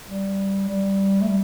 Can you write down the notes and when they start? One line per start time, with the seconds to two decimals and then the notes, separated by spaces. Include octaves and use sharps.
0.08 G3
0.68 G3
1.21 A3
1.28 G3